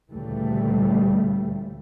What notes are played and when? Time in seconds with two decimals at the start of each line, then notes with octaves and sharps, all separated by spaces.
0.12 D2 A#2 C#3 E3 G3 A3